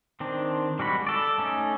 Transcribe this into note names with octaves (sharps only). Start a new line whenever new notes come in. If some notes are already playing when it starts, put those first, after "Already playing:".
D#3 C4 D4
G3 G#3 F#4 B5
A4 D5
A3 C#4 D#4